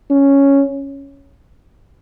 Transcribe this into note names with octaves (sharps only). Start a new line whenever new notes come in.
C#4